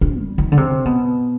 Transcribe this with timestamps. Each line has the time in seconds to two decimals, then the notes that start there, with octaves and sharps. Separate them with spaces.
0.01 D4
0.20 G3
0.38 D#3
0.52 D3
0.57 C3
0.85 B2